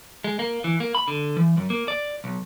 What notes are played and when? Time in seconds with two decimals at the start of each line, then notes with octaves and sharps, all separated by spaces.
0.24 G#3
0.39 A#3
0.64 E3
0.80 A#3
0.95 B5
1.08 D3
1.37 E3
1.57 F#2
1.70 A#3
1.88 D5
2.24 B1